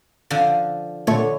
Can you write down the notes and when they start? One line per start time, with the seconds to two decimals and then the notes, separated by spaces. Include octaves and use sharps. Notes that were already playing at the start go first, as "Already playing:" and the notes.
0.30 D3 F3
1.07 A#1 D3 A3 C#5